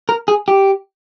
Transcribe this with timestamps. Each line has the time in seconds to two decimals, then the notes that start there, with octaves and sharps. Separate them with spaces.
0.09 A#4
0.28 G#4
0.48 G4